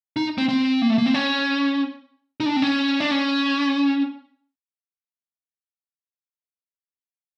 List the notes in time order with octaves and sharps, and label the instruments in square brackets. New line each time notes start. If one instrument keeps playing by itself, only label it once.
[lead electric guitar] D#4
C4
C4
A#3
A3
A#3
C4
C#4
D#4
D4
C4
C#4
D4
C#4